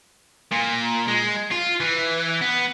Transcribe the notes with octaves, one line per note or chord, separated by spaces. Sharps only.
A#2
G#3
F4
E3
B3